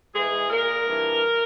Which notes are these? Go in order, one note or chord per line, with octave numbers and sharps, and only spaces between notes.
G#2 E3 G#4
A#2 A#4
G2 E3